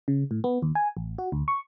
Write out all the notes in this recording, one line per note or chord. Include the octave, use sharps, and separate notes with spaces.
C#3
A2
B3
D#2
G#5
A1
F#4
D2
C#6